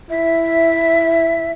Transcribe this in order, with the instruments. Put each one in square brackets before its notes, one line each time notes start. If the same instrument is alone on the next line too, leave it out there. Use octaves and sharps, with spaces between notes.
[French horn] E4 [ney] E5